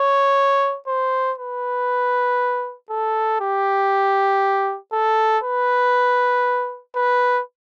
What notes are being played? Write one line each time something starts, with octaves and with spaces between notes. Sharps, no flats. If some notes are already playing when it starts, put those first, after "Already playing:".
Already playing: C#5
C5
B4
A4
G4
A4
B4
B4